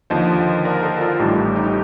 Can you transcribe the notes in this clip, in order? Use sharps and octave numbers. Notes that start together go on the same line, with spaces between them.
D#2 D3 F3 C5 D#5
A#4 D5
A4 C5
F4 A4
A1 A2 G3 D#4 G4
D#4 G4